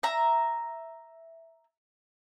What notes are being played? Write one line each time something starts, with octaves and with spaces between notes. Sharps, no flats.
E5 A#5